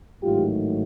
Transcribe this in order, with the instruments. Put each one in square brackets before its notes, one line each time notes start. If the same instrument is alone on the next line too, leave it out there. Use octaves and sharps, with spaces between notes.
[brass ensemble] A1 G#2 D#3 F#3 A3 F4 G4